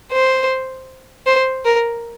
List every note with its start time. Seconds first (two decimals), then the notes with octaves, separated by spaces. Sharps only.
0.12 C5
1.27 C5
1.65 A#4